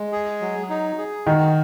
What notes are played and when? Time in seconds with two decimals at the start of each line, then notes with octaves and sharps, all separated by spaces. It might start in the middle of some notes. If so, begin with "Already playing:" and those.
Already playing: G#3
0.12 G#4
0.41 F#3
0.70 D#4
0.98 G#4
1.26 D#3 F#4